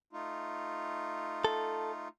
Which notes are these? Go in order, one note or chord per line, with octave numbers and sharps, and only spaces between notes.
A3 D#4 F4
A4